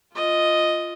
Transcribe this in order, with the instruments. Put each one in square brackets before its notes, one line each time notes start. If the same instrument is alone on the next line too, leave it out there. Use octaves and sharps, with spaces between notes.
[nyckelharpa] F4 D#5